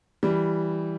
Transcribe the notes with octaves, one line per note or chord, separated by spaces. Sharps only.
E3 G3